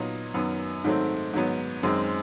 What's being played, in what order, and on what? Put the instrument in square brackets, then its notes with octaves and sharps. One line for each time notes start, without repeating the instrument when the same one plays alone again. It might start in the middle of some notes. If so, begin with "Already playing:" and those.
Already playing: [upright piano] A#2 F#3 B3 D#4
F#2 D#3 F#3 B3
G#2 D#3 F#3 A3 C4
G#2 D#3 F#3 B3
F#2 D#3 G#3 C4